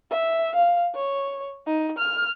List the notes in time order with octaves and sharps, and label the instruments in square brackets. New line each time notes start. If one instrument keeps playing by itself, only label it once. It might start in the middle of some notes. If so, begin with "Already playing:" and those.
[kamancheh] E5
F5
C#5
D#4
F6